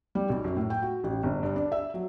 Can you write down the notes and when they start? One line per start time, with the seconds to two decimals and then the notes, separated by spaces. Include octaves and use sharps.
0.15 G3
0.29 B1
0.44 F#2
0.57 A2
0.70 G5
0.82 F#4
1.04 A1
1.23 G1
1.43 G2
1.56 D4
1.72 E5
1.94 F#3